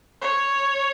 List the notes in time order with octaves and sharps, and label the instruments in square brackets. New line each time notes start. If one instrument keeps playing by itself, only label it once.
[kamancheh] C#5